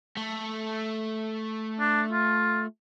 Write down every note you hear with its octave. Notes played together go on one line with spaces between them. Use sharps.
A3
D4
F4